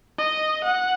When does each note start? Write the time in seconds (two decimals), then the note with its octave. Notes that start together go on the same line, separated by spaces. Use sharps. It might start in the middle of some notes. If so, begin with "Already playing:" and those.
0.18 D#5
0.64 F#5